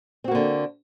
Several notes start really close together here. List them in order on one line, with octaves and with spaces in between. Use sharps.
C4 F#4 A#3 D3